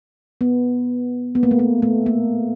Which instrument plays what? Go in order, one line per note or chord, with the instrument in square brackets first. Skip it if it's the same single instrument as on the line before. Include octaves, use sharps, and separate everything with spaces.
[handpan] B3
B3
A#3
A3
A#3
A3
A#3